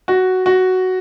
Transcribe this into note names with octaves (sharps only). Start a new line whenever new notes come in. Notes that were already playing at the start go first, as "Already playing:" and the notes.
F#4
F#4